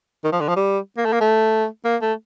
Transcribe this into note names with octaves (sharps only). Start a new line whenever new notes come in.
D#3
F3
D3
F3
G3
A#3
A3
A#3
A3
A#3
A3